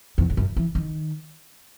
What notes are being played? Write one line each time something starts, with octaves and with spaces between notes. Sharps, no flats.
E2
E2
F#2
E3
D#3